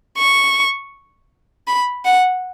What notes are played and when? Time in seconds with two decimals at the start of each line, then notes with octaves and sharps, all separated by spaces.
0.18 C#6
1.67 B5
2.05 F#5